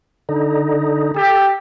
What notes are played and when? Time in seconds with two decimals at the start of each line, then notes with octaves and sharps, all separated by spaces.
0.29 D3 D#4
1.16 G4 A4